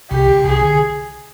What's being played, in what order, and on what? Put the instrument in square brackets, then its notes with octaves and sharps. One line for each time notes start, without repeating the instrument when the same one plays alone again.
[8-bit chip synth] C2 C3 [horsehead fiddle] G4
[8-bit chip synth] C#2 C#3
[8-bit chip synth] C2 C3 [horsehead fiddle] G#4
[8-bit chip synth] D3